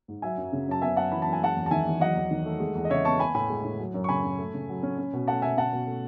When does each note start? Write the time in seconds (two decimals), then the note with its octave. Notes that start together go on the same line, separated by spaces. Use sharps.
0.08 G#2
0.22 F#3 E5 G#5
0.38 F#2
0.52 C#3
0.68 F#2 A5
0.82 B3 E5 G#5
0.97 F#2 F#5 A5
1.12 E3 B5
1.22 F#2 A5
1.33 G#5
1.42 G#3 F#5 A5
1.57 E2
1.66 A5
1.71 D#3 E5 G#5
1.86 E2
2.01 F#3 D#5 F#5
2.15 E2
2.31 D#3
2.46 A3
2.60 G#3
2.75 E2
2.85 D#5
2.90 C#3 C#5 E5
3.05 B3 A5 C#6
3.19 B3 G#5 B5
3.35 A2 G#5 B5
3.49 G#3
3.65 A2
3.79 F#3
3.94 F#2
4.04 C#6
4.09 C#3 G#5 B5
4.24 F#2
4.38 A3
4.54 C#3
4.69 F#3
4.83 C#4
4.98 C#4
5.13 B2
5.27 A3 F#5 A5
5.42 B2 E5 G#5
5.57 C#4 F#5 A5
5.73 B2
5.87 A3